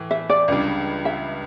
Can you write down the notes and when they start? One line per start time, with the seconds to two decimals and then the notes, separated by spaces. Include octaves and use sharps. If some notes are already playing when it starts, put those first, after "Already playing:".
Already playing: A2 E3
0.11 E5
0.30 D5
0.48 C#2 C#3 G3 D4
1.05 E5